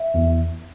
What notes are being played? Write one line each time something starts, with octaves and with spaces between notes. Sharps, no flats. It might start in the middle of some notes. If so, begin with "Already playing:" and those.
Already playing: E5
E2